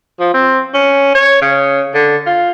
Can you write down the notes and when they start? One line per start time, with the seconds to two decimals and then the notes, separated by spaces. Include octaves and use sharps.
0.20 F3
0.34 C4
0.74 C#4
1.15 C#5
1.42 C#3
1.94 D3
2.26 F4